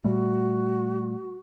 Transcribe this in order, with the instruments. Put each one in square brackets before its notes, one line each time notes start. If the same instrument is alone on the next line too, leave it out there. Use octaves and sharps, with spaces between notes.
[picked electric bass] A#2 G3 A3 [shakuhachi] F#4